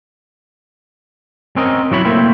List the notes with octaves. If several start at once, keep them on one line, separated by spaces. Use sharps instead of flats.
C4 C#4 A#4 D#5
F#3 E4 C#5 B5
A3 A#3 C4 E4